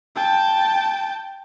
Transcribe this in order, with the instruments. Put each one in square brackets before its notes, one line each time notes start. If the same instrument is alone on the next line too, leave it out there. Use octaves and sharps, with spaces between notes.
[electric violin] G5 A5